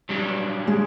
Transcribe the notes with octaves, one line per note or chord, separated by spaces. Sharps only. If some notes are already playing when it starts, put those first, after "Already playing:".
F#3 G3 D4
G#3